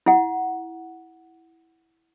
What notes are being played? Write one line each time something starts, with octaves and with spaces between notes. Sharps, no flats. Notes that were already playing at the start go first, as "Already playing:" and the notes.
E4 F#5